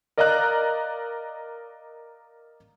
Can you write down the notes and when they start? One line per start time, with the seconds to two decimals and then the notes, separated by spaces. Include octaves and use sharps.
0.18 A#4 D5 D#5 F5 A#5 F#6